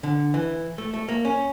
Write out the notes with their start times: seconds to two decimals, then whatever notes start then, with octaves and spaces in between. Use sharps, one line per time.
0.03 D3
0.34 E3
0.78 A3
0.94 A3
1.09 A#3
1.25 C#4